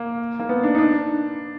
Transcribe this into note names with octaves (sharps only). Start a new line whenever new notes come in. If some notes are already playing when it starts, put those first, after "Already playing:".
Already playing: A#3
A#3
B3
D4
D#4
D4